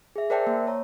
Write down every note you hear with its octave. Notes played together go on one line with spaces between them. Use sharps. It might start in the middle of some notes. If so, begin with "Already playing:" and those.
G#4 E5
A#4 C5 D5 E5 G5 A5
A#3
C#5 A#5